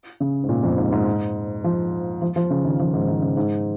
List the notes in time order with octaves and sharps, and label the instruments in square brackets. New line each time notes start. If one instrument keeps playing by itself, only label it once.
[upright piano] C#3
G#2
A#2
F2
G#2
G#2
F3
F3
F3
C#3
D#3
F3
G#2
D#3
C#3
G#2